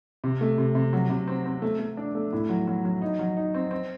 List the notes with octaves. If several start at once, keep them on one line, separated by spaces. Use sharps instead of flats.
C3
A3
C3
C3
F#3
C3
C4
C4
A3
A3
D4
A3
A2
F#3
F#3
F#3
D#4
F#3
D#4
C4
C4